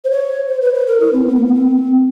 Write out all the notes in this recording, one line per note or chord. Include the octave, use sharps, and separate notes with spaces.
C5
C#5
C5
B4
B4
A#4
E4
C4
B3
A#3
B3
C4